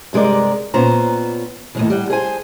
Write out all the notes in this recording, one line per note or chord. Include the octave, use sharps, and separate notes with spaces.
G2 C3 G#3 A#4 D5
A#2 B3 C#4 C5 A#5
D#2 A2 C#3
G3 F#5
G#4 C5 G#5